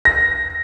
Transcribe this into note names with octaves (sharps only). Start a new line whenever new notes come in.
A#6